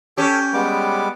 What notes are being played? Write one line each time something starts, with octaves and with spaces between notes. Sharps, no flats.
C#4 G4 A4 C#5 G5
G3 G#3 B3 D6